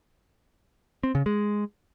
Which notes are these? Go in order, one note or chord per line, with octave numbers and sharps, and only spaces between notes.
C4
C#3
G#3